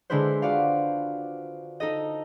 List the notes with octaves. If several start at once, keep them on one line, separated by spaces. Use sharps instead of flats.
D3 G#3 D4 E4 B4 C5
F4 F#4 D5 F5
D#4 A4 D#5